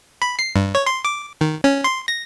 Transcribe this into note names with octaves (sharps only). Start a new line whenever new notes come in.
B5
C7
G2
C#5
C6
D6
D#3
C#4
C6
A#6